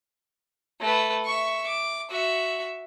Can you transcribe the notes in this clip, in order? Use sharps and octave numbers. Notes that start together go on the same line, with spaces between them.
A3 B4
E5 C#6
D6
F#4 E5